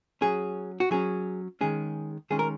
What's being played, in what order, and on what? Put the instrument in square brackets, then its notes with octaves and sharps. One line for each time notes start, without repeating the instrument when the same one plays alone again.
[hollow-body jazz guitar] F#3 C#4 G#4
F#4
F#3 C#4 G#4
D#3 G#3 C#4 G#4
D#3 G#3 C#4 G#4
A#4